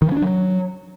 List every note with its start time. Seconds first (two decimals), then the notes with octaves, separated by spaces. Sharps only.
0.02 D#3
0.07 F3
0.12 C#4
0.17 D4
0.22 F#3